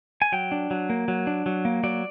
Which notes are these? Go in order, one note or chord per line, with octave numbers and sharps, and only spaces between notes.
G#5
F#3 G5
D4
F#3
A#3
F#3
D4
F#3
A#3
F#3 D5